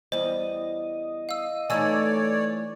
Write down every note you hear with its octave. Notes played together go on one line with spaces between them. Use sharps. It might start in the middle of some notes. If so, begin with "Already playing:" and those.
E2 G3 C5 D#5
F5 E6
E3 A3 D#4 C#5 D5 G#5 E6